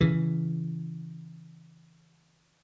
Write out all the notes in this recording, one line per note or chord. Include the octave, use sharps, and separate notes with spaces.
C#3 E3